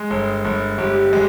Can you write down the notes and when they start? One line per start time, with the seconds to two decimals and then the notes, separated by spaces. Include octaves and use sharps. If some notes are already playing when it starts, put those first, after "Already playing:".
Already playing: G#3
0.10 G1
0.45 G1
0.78 G1 G4
1.13 G#3